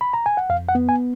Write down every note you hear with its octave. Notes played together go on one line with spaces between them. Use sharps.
B5
A#5
G#5
F#5
F2 F5
F#5
B3
G#5